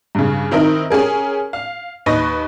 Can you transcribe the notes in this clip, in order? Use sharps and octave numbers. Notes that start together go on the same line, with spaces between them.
G2 C#3
D#3 C4 D#4 E4 A#4
C#4 G4 G#4 A#4
F5
D#2 B4 D#5 C#6 A#6